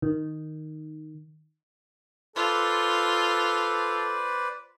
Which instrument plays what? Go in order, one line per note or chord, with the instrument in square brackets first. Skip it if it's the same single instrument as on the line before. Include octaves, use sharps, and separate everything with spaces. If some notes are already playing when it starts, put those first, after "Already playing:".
[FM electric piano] D#3
[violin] F4 [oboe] A4 [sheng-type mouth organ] B4 C5 D5